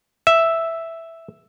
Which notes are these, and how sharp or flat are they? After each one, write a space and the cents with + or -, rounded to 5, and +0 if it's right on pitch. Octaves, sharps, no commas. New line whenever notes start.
E5 +0